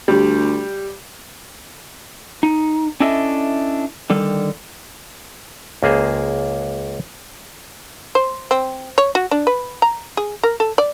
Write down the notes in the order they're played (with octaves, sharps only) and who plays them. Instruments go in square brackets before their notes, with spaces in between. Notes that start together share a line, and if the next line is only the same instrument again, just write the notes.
[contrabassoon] D2 [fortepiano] G3
[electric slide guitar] D#4
C#4 D4 E4 A4 D#5 E5
D3 D#3 G3 A4
[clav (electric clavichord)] C#2 A#3 G#4 C5
[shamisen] C5
C4
C#5
F#4
D4
B4
A#5
G#4
A#4
A4
D5